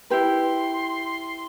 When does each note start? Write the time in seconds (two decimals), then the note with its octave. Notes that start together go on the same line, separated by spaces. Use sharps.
0.10 E4 G4 B4 C6